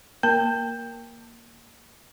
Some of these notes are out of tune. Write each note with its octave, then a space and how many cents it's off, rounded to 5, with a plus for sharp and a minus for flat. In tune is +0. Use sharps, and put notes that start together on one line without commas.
A#3 +0 A#4 +5 A5 +30